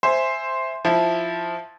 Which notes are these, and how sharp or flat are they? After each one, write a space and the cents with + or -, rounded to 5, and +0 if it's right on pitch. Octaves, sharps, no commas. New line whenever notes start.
C5 +0 E5 +0 G#5 +0
F3 +0 E4 +0